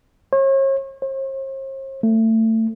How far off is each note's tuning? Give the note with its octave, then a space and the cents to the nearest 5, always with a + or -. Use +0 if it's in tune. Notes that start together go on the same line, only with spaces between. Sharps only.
C#5 -40
C5 +45
A3 +25